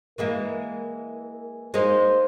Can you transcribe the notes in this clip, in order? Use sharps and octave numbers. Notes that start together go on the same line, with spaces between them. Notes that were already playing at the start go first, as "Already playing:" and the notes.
E3 G#3 A#3 A#4
G#3 A#3 D#4 C5